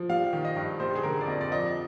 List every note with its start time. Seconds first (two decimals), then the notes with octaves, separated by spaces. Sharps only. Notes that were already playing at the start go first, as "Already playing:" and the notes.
Already playing: F3
0.09 G3 F5
0.33 D#3
0.45 D#5
0.56 G2
0.80 G3 C5
0.96 G#4
1.03 D3 A#4
1.21 D5
1.27 F2 D#5
1.41 D5
1.51 F3 D#5